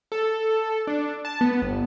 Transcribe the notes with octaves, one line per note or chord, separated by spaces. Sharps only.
A4
D4
A5
B3
G1